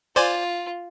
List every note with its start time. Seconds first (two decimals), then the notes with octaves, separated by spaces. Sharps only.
0.16 F4 C5 D5 G#5